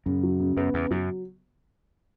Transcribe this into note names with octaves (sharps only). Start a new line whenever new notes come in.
F#2 C#3
F#3
C#3
F#2 B3
E2 C#3
F#2 F#3